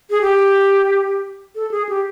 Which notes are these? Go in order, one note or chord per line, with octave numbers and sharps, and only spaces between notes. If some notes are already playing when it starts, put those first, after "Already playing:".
G#4
G4
A4
G#4
G4